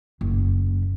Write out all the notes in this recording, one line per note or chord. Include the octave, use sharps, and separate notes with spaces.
F#1